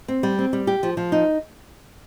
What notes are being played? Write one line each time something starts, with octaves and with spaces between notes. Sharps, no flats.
C4
G3
C4
G3
G4
F3
F3
D#4